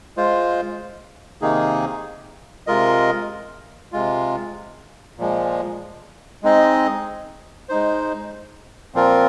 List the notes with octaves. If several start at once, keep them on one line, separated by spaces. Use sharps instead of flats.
G#3 F4 C5
C3 D#3 A#3 D#4 G#4
C3 G#3 F4 A#4 D#5
C3 G#3 F4
A#2 F3 G#3
G#3 C4 D#4 G#4 D#5
G#3 D#4 C5
A#2 F3 C4 F4 A#4